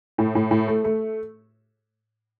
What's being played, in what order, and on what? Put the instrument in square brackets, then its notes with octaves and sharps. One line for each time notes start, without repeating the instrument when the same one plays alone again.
[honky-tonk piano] A2
A2
A2
A3
A3